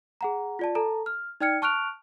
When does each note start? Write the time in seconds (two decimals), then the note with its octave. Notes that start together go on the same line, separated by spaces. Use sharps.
0.21 G#4 F#5 A#5
0.59 F4 D5 A5
0.75 A4 A5 A#5
1.06 F6
1.41 D#4 D5 G5 F6 G#6 C#7
1.62 A5 C#6 F6 F#6 D7 F7